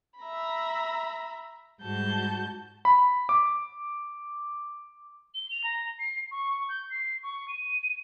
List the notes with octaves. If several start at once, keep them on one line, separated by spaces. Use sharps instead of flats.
E5 A#5 B5
G#2 G3 F#4 A5 G6
B5
D6
G7
F7
A#5
C7
C#6
G6
C7
C#6
D#7